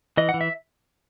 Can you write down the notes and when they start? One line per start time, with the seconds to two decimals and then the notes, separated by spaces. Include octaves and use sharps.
0.17 E3 D#5
0.29 F#5
0.34 E3
0.41 E5